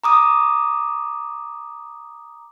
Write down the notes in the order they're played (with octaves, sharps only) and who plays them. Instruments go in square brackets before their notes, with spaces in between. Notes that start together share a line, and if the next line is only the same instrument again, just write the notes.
[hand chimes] A#5 D6 D#6